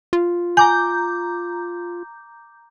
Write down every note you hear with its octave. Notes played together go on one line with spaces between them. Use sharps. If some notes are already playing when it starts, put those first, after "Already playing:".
F4
G#5 A#5 D6 G6